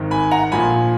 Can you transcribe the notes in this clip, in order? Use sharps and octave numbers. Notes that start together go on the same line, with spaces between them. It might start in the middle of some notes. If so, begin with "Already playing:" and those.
Already playing: G#1 G#2 D#3
G#5 B5
F#5 A#5
A#1 A#2 F3 G#5 B5